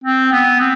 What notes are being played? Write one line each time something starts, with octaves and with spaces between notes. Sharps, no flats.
C4
B3
C4